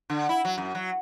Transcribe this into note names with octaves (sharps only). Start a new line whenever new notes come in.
D3
E4
F#3
F#2
F#3